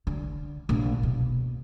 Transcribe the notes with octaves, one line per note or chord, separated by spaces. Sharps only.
D3
A#1
B2